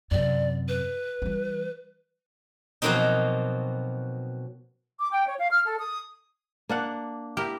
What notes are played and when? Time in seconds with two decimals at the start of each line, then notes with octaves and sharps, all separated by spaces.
0.11 F#2 C3 D5
0.68 B4
1.22 E3 G3
2.82 B2 F3 F#3 A#3 C4 D#4
4.99 D6
5.12 G5
5.28 C#5
5.39 F5
5.51 F6
5.65 A4
5.79 D#6
6.69 A#3 D4 F#5
7.37 E4 G4 A#4